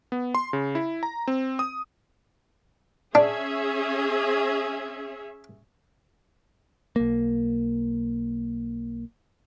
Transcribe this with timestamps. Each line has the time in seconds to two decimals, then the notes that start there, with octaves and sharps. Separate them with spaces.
0.12 B3
0.35 C6
0.53 C#3
0.75 E4
1.03 A#5
1.27 C4
1.59 D#6
3.15 C#4 D4 G#4 E5
6.96 B1 A#3